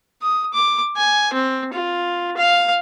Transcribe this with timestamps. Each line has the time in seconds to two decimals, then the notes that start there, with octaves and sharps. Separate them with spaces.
0.22 D#6
0.53 D6
0.97 G#5
1.33 C4
1.73 F4
2.37 F5